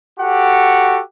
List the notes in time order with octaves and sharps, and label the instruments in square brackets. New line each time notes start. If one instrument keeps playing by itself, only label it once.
[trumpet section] F#4 G4 A4 F#5